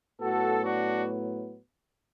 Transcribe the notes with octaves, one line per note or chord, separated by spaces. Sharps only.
A2 F#3 B3 F#4 A4
D4 F#4